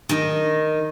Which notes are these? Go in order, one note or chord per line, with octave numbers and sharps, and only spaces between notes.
D#3 D#4